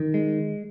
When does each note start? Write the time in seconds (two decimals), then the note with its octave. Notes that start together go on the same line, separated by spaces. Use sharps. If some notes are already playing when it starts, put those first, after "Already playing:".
Already playing: D#3
0.14 G#3